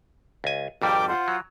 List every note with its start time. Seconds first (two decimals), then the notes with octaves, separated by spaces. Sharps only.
0.44 C#2 G#5
0.82 G#1 F2 G3 A#4 G5 D6
1.09 F4 C5 F#5
1.28 F#3